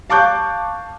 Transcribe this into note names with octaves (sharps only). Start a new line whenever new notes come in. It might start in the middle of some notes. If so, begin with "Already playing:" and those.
F5 A5 C#6 D6 F#6 G6